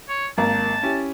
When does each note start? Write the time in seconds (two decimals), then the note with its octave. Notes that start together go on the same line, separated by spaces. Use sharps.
0.08 C#5
0.38 G#1 A#3 A5 A#5
0.83 C#4 E4 G4